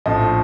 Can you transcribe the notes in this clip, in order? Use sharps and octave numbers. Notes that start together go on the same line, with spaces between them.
A#1 A2 F3 D#5